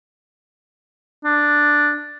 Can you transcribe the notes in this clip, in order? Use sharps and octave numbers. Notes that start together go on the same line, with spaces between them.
D4